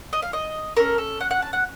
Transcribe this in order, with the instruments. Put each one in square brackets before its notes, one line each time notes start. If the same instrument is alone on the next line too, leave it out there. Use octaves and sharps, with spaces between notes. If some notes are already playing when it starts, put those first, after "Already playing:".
[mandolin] D#5
F5
D#5
C#4 A4 A#4
A4
F#5
F#5
A5
F#5